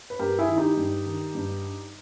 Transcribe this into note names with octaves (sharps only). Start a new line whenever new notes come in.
B4
G2 G4 A#4
E4 G#4
D#3
D#4 G4
G2
D#3
G2